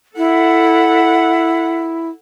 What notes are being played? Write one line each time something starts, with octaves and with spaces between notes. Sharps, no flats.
E4 A4 F#5